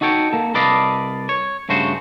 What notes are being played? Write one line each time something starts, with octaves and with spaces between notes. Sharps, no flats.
D#4 F#4 A4 C#5 G5
A#3 A4
C2 A4 B4 D5 D#5 F5
C#5
G2 C#3 A3 F#4 C5